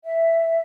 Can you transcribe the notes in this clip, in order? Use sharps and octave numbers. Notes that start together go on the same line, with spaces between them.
E5